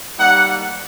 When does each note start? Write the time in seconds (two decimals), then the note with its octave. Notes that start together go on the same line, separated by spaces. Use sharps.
0.18 G3 A#3 D#4 F#5